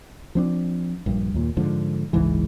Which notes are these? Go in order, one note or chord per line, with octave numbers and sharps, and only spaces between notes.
F3 C4 D4
A#1 G2
D#2 A#2
G#2 D3 F3
F#1 C#2 G#2 E3